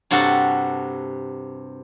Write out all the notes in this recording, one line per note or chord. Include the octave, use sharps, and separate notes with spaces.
G2 C3 F#4 A4 F#5 A#5